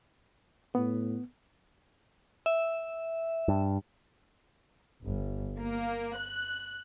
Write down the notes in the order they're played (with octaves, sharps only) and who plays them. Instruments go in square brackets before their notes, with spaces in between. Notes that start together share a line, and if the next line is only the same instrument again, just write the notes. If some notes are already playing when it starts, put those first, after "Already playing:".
[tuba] A2 [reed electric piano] B3
[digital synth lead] E5
[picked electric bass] G2
[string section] G1
A#3
F#6